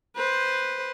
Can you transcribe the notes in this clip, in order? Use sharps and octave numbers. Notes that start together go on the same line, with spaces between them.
B4 C5